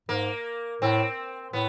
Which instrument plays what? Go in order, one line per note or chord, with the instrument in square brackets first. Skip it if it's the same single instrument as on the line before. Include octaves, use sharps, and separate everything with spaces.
[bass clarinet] G#2 [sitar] A#3
[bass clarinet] A2 [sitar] C4
[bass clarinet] A2 [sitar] B3